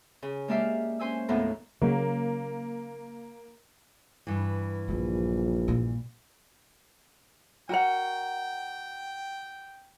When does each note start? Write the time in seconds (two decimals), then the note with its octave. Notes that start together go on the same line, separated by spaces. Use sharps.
0.22 C#3
0.48 G#3 A#3 D4 G4 E5 F5
1.00 C#4 C5 G#5 E6
1.28 D#2 A2 F#3 B3 A#5
1.82 C#3 F#3 A#3
4.27 G2 E3
4.88 A#1 D3 F#3
5.68 A#2
7.69 F#4 A#4 F#5 G5